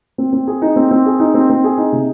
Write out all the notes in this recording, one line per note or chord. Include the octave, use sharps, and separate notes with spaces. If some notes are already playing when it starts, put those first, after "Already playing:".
C4
C4
G#4
D#4
C4
C4
G#4
D#4
C4
C4
G#4
D#4
C3